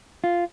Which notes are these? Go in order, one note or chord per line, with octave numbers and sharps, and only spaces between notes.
F4